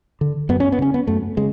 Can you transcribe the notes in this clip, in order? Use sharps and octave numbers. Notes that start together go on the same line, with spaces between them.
D3
F#2 B3
C#4
B3
C#3 C#4
B3
F#2 A3
C#3 G#3